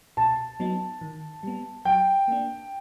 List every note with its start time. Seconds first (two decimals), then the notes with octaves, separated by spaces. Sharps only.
0.17 B2 A5
0.60 F#3 B3 D#4
1.01 D#3
1.43 G3 B3
1.85 F#3 G5
2.28 A#3 D4